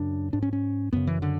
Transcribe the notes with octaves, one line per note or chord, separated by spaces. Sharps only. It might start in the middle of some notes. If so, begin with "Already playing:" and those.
Already playing: F#2 C#3 D4
G#2 D4
C#4
C#4
F#2 C#3 B3
E3
D3